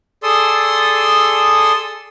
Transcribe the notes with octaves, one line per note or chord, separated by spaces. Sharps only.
G#4 A4 D5 C6 D#6 E6